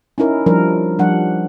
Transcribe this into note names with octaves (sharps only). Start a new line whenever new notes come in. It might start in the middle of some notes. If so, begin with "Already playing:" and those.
C#4 D#4 E4 A#4
F3 G3 D4 A#4
F3 G3 D4 F#5